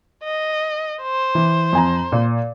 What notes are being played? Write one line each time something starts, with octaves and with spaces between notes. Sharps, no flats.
D#5
C5
E3
F2 G#5 A#5
A#2